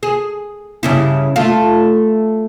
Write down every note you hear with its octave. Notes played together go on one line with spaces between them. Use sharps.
G#4
G2 C#3 E4
A3 F4